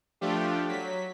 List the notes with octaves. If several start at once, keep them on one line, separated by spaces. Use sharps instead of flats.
F3 A3 D4 F4 G4
F#3 B6